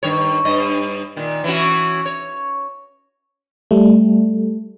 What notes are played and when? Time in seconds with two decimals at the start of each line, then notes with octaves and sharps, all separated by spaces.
0.03 G2 D#3 C#5
0.45 G2 D#5
1.16 A#2 D#3
1.44 E3 C#4 F#4
2.06 C#5
3.71 G3 A3